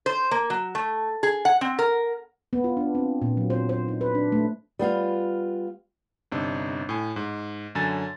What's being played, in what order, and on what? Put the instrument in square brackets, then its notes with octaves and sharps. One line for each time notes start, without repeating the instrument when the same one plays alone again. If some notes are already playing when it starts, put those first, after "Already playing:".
[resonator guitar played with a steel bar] C5
A#3
F#3
A3
G#4
F#5
C4
A#4
[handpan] B3
F4
D4
C4
A#2
F#3
C5
C5
D#4
B4
D4
A3
[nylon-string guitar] G3 B3 F4 F5
[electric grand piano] G1 C3 D4 D#4
A2 G#5
G#2
F#2 D3 G#5 A6